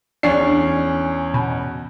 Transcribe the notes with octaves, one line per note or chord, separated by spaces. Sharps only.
E2 C#4 D4 C7
B2